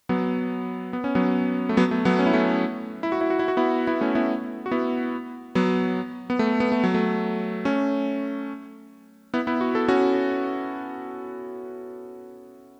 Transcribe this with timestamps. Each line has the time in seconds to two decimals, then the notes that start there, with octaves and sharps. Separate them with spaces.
0.09 F#3 B3
0.93 B3
1.04 C#4
1.15 F#3 B3
1.69 A3
1.77 F#3 B3
1.91 A3
2.05 F#3 B3
2.19 C#4
2.26 E4
2.33 A3 C#4
3.03 E4
3.12 F#4
3.21 E4
3.30 F#4
3.39 E4
3.48 F#4
3.57 B3 E4
3.87 B3 E4
4.01 A3 C#4
4.15 B3 E4
4.66 F#4
4.71 B3 E4
5.55 F#3 B3
6.30 B3
6.39 A3
6.60 B3
6.72 A3
6.84 F#3
6.94 A3
7.65 A3 C#4
9.34 B3 E4
9.47 B3 E4
9.61 F#4
9.75 A4
9.88 C#4 F#4